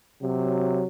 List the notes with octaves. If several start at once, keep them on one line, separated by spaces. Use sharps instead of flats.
C3 F#3